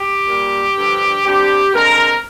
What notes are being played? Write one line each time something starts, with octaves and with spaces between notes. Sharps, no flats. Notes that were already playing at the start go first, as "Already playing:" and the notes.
Already playing: G4
A#2 G3 A#3
G2 D3 F3
D3 G3 C4 G4
D3 G#3 C4 A#4